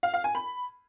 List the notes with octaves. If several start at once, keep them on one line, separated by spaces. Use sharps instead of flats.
F5
F5
G#5
B5